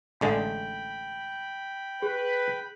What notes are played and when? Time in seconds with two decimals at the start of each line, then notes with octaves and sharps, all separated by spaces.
0.21 A1 D3 G#3 G5 B5
2.02 G#4 B4